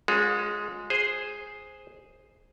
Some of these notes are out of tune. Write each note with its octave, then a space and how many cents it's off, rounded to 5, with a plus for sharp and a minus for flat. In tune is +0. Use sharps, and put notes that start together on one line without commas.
G#3 +0 C#4 +0 F4 +45
G#4 +0 C5 +0